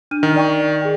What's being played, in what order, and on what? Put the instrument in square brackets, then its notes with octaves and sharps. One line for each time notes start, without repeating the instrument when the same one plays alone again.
[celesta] D4 F6 D#7
[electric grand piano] D#3
[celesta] D5 G5 C#6
G#4 G5